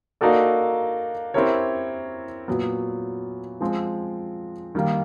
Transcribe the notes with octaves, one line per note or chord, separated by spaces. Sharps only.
A#3 D#4 F#4 A4 D5
C4 E4 G4 A#4 C#5
A#2 F#3 B3
F3 G#3 C4
D#3 G3 A#3